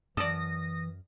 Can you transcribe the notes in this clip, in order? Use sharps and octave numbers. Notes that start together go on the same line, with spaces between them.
F#2 E3 A4 D5 D#6 A#6